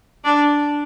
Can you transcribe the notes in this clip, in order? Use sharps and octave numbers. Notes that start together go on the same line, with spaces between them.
D4